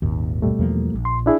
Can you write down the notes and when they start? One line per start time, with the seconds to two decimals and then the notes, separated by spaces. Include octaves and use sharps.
0.02 D#1 G#1 D#2
0.42 B2 G3 A3
0.59 E2 F3 A#3
0.93 A#1
1.05 C6
1.26 D4 E4 G#4